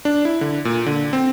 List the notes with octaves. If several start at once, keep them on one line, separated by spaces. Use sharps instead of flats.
D4
E4
D3
A#2
D3
C4